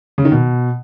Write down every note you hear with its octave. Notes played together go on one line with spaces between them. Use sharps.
C#3
D#3
B2